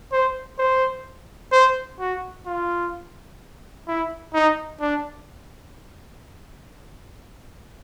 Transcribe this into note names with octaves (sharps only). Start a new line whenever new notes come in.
C5
C5
C5
F#4
F4
E4
D#4
D4